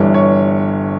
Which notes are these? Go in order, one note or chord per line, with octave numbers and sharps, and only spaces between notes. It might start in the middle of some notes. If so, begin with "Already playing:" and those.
Already playing: G1 G2 E3 C#5
C#5